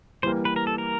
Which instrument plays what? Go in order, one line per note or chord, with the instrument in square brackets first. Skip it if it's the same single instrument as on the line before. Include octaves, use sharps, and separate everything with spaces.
[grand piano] E3 G3 A#3 [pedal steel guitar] C5
[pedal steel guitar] B4
A#4
A4
A#4